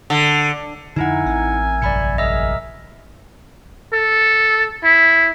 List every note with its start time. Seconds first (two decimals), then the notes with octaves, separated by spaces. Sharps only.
0.10 D3
0.96 F2 D3 D#4 E4 A#4 E5 F#5 G#5
1.26 A1 C4
1.82 C2 F#2 A#2 D5 B5 C#7
2.18 G#4 A#4 D#5 E5 E6
3.93 A4
4.85 E4